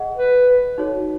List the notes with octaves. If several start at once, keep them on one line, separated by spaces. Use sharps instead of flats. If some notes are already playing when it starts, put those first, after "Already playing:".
Already playing: G#4 D#5 F#5
B4
D#4 F#4 A4 C#5